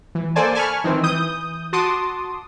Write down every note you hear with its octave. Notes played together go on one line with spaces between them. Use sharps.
E3
A#3 A4 C5 D5 G#5 A5
G#5 A5 B5 C#6 F6
D#3 E3 C4
E3 D#6 G6
F#4 A5 C6 D6 D#6